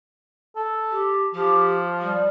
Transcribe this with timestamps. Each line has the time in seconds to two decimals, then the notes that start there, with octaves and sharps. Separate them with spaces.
0.56 A4
0.91 G4
1.35 F3 G4
2.01 G3